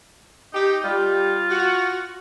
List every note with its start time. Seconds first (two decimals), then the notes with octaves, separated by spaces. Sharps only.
0.53 D#4 G4
0.84 G3 F4
1.49 F#4